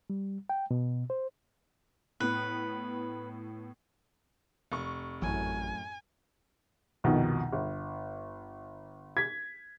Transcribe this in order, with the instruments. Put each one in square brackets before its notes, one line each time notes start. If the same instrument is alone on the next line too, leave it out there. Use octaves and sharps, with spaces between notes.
[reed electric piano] G3
G5
B2
C5
[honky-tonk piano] A2 B3 [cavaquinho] B4
[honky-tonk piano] F1 C#6
[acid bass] A1 [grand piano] F#2 A2 [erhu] G#5
[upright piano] C2 F2 B2 D#3
G1
G#6 B6